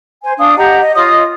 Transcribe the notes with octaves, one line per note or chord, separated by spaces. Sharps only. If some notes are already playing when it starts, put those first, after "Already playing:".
C5 G#5
D4 F5 D#6
G4 D#5 F#5 A#5
D#5
F4 C#5 D#5 D#6